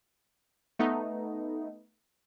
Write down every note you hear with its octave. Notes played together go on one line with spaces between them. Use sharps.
A3 B3 D#4